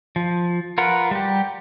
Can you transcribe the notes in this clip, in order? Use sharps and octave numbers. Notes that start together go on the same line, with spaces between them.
F3
F4 A#4 B4 F#5
G3 G4